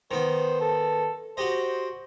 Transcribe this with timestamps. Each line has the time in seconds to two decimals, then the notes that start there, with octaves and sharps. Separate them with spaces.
0.11 D#3 B3 C5
0.61 A4
1.37 F#4 G4 C5 D#5